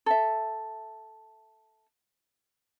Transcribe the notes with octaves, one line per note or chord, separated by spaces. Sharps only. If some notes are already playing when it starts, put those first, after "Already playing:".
A4 E5